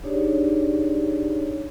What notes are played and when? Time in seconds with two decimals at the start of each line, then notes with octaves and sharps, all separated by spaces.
0.03 D4 D#4 G4 G#4 C#5 D5